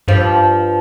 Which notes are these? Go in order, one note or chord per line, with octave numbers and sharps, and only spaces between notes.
G2 F3